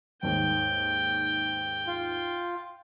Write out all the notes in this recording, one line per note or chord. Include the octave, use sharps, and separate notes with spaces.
D#2 G#2 G5
F4